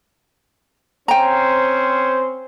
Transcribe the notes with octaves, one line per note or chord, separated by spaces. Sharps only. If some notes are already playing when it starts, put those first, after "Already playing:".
C4 C#4 C5 G5 A#5